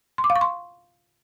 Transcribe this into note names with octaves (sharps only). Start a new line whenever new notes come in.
C6
D6
F5
C#6
C6